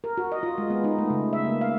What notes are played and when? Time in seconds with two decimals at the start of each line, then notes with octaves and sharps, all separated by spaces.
0.04 A#4
0.17 F#4
0.32 D#5
0.43 F4
0.58 G#3
0.70 B3
0.84 D#4
0.99 A3
1.10 C#3
1.33 E5
1.45 A#3
1.61 F5